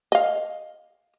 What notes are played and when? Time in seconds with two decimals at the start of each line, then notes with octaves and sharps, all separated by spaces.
0.12 D#5 F5